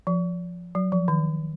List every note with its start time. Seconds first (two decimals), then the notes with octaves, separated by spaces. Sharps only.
0.07 F3
0.75 F#3
0.92 F3
1.08 D#3